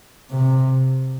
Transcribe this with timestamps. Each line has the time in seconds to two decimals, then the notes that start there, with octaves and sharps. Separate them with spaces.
0.30 C3